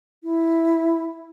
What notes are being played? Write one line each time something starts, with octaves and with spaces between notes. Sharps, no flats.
E4